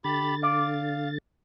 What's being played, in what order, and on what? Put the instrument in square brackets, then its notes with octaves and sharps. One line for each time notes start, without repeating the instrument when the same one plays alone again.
[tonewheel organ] D3 A6 [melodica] G4 B5
[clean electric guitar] D5 [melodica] F5